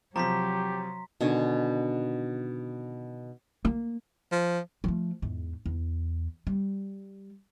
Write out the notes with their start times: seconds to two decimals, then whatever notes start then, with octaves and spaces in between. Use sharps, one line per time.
0.16 C3 F3 F#3 G4 A#5 C6 B6
1.21 B2 D3 D#3 G#5
3.65 A#3
4.32 F3
4.84 F3 A3
5.22 E2 G#2
5.66 E2
6.47 G3